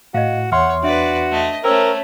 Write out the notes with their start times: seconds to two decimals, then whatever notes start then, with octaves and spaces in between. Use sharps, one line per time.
0.14 A2 F#4 D#5 F5
0.52 E2 C#5 E5 F#5 C6 F6
0.83 D4 F#4 B4 D5 E5
1.31 A3 D#5
1.64 A3 C#4 A#4 C5 G5 E6